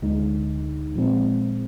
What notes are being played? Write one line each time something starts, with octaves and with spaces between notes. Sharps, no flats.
D2 D3 G#3 D#4
A#2 F3 G#3 C4